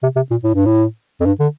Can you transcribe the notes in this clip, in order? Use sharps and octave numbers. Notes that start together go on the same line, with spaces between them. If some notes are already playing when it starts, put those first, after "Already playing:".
C3
C3
A#2
A2
G2
A2
F2
G2
D3